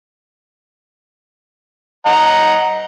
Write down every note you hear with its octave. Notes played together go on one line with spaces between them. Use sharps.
D#5 F#5 A#5